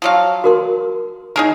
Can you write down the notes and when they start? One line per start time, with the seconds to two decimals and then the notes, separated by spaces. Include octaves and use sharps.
0.02 F3 F#3 F5
0.44 F#4 A#4 C6
1.36 D#4 G#4 A#4 A#5